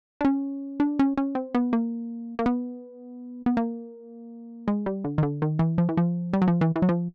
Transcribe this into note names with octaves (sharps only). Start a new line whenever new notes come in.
D4
C#4
D4
C#4
C#4
C4
B3
A#3
A#3
B3
B3
A#3
G#3
G3
D3
D#3
D3
D#3
E3
F3
E3
F3
G3
F#3
F3
E3
E3
F#3
F3